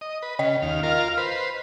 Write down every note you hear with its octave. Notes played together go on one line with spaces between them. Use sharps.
D#5
B4
C#3 D#5
D#2 F5
F4 A#4 F5
B4 C5